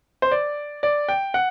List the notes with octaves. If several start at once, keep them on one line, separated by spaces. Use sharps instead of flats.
C5
D5
D5
G5
F#5